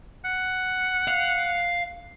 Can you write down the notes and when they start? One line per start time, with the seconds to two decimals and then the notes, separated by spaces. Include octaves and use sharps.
0.25 F#5
1.08 F5